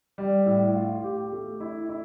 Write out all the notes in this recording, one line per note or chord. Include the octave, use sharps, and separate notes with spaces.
G3
A2
F4
G4
A3
E4
E4